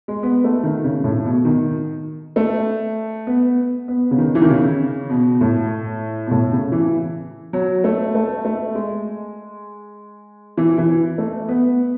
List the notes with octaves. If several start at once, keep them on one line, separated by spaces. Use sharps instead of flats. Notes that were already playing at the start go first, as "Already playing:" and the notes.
G#3
B3
A3
D#3
C#3
A2
B2
D#3
A3
B3
B3
C#3
D#3
E3
D#3
C#3
B2
A2
B2
A2
C#3
E3
F#3
A3
A3
A3
G#3
E3
E3
A3
B3